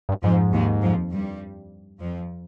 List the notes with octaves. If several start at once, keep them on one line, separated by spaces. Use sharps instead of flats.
G2
F2 G#2 F3
D#2 D#3
F2 F3
G2 G3
F2 F3